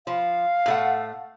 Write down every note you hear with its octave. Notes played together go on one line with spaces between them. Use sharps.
F3 F5
A2 A3 F#5